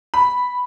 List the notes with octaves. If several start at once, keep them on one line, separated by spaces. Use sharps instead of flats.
B5